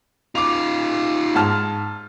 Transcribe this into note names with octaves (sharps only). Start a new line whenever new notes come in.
D#4 F4 D6 F7
G#2 A5 F6